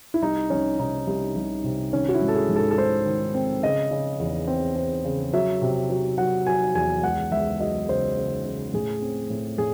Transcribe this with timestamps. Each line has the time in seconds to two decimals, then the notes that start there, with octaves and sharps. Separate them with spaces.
0.14 E4
0.22 C2 D#4
0.50 C2 C#4
0.79 C3 D#4
1.07 C2
1.36 C2
1.64 C3
1.93 D#3 C#4
2.09 F#4
2.14 E4
2.22 G#2
2.28 A4
2.35 G#4
2.49 G#2
2.56 A4
2.71 A4
2.78 G#3 C5
3.06 D#3
3.34 C4
3.63 C#3 D#5
3.91 C#3
4.20 E2
4.47 C4
4.76 C4
5.05 C#3
5.33 F#3 E5
5.61 C3
5.90 F#3
6.18 F#3 F#5
6.47 F#3 G#5
6.75 E2 G#5
7.03 C#2 F#5
7.32 C#2 E5
7.60 F#3 D#5
7.89 C#3 C5
8.17 C#3
8.45 C#3
8.74 A2 G#4
9.02 C4
9.30 A2
9.58 A2 G#4